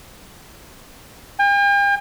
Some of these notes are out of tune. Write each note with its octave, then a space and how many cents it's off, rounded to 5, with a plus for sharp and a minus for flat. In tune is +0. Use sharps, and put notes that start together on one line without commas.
G5 +45